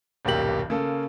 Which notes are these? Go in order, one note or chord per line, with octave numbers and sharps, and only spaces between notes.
D#1 B1 G2 A#3 G4 F#7
C#3 A#3 A4